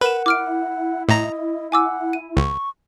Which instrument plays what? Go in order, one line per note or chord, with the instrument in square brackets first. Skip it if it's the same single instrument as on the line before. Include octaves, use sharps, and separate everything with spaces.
[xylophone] A#4 E7 [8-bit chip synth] B4 [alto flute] F#5
[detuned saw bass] E4 [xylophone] D6 F6 D7
[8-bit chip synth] A2 A#5 [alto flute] D#5
[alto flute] F#5 [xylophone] G#5 D6 E6
[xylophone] D#7
[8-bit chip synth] C#2 [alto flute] C#6